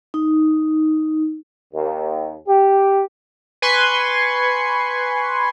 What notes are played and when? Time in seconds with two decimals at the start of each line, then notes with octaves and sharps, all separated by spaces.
0.14 D#4
1.74 D#2
2.48 G4
3.62 B4 G#5 C6 C#6